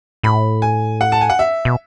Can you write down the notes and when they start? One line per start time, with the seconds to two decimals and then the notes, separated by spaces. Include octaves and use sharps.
0.23 A2 B5
0.62 G#5
1.01 F#5
1.12 A5
1.21 G#5
1.30 F#5
1.39 E5
1.65 B2